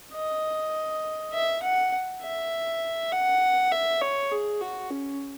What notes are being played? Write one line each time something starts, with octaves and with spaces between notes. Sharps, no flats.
D#5
E5
F#5
E5
F#5
E5
C#5
G#4
F#4
C#4